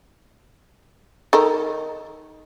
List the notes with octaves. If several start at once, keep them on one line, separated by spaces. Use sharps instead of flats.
D#3 A4 A#4